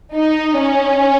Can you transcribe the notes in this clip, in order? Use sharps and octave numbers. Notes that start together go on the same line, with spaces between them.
D#4
C#4